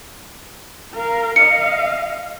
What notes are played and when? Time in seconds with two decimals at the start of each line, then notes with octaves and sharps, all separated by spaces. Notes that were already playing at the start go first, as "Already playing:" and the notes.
0.94 A#4 F5
1.36 D#5 F5 C#7